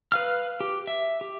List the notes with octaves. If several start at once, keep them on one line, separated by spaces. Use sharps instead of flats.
B4 F5 F6
G4
E5
G4